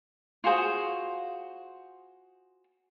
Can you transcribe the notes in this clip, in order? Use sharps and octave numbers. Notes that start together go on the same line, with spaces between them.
F4 F#4 G#4 C5